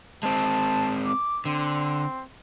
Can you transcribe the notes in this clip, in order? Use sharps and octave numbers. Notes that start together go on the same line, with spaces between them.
G#3 C4 A5
D6
D3 C4